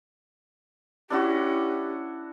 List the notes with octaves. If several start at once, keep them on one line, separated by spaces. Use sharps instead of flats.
C#4 D4 E4 F#4 G4